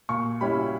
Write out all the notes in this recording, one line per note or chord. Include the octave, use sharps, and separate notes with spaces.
A#2 C#6
G3 C#4 E4 B5